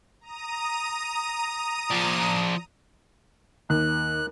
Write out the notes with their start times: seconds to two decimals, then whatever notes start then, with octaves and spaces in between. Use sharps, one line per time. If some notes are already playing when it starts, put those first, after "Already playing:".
0.21 A#5 D#6 D#7
1.91 F3 D5
3.70 D#2 F#6